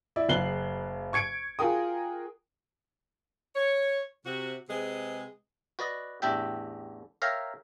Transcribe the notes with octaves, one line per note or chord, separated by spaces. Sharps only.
E4 D5 E5
F#1 C#3 F#6 C7 F#7 G7
C#6 G#6 C#7 D7
F4 F#4 G#4 A#4 G5 D#6
C#5
C3 F#4
C3 G#3 C4 G#4 B4
F#4 B4 D5 D#5
A1 E2 D4 G4 E5 G5
A#4 C#5 E5 F5 G5 A#5